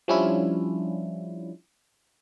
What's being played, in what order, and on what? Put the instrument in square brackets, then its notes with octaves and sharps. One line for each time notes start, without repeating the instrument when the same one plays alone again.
[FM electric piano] F3 G3 C#4 D4 E4 F4